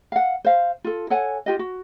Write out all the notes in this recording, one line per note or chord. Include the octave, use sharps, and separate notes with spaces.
F5 F#5
C5 F5
F4 A4
A4 C#5 F#5 G#5
F4 G4 D#5
F#4